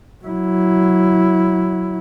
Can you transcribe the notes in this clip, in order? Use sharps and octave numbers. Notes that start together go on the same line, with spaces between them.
F#3 E4